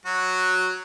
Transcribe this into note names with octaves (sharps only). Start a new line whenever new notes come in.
F#3 F#4